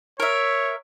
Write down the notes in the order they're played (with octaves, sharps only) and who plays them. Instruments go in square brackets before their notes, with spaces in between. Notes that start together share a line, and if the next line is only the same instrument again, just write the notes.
[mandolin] A#4 E5 [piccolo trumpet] C#5